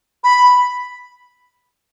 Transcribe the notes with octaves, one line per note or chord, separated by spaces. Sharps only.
B5